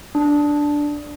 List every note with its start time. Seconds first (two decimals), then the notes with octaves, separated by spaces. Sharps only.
0.15 D4